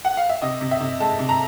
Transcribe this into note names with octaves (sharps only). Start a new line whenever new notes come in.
F#5
F5
E5
C3 D#5
C3
E5
C3
G#3 A5
C3
A#5